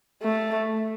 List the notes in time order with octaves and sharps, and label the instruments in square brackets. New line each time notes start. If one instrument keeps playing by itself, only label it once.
[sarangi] A3